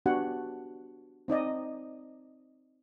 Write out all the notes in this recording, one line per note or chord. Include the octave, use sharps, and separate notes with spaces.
B3 D4 F#4 G4 F#5
C4 D#4 D5 D#5